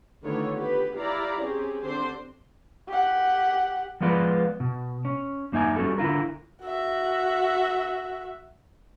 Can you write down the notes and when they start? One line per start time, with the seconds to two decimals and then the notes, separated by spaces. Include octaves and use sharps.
0.23 D3 D#3 A3 B3 F4 C#5
0.54 B3 G4 B4
0.95 E4 G4 D5 F5 A#5
1.40 C4 C#4 G4 G#4
1.83 D3 C4 D4 C5 C6
2.88 G4 F#5
4.01 F3 G#3 B3 F4 B4 D5
4.60 B2
5.05 C#4
5.52 F#2 A#3 D#4 E5 G#5
5.76 G3 C#4 E4 F#4 G4 A4
5.98 D3 E4 F4 A#4
6.62 F#4 E5